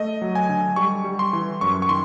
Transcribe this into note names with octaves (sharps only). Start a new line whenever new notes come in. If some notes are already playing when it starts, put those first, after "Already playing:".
Already playing: A3 D#5
F#3
G#5
D3
G3 C#6
G3
C6
E3
F#2 C#6
C#6
D#3 C6